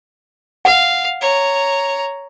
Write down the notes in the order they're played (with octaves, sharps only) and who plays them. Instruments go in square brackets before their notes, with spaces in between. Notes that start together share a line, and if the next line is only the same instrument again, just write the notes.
[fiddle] F5 [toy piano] F#5
[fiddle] C#5 A#5